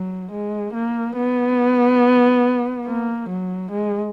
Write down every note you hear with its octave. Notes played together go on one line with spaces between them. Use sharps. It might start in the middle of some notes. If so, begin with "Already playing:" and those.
Already playing: F#3
G#3
A#3
B3
A#3
F#3
G#3